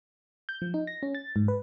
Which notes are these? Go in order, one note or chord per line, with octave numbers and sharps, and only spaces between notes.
G6
F3
D#4
A#6
C#4
A6
G#2
B4